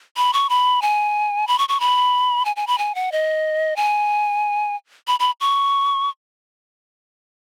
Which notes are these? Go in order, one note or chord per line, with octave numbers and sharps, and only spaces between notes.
B5
C#6
B5
G#5
B5
C#6
C#6
B5
G#5
G#5
B5
G#5
F#5
D#5
G#5
B5
B5
C#6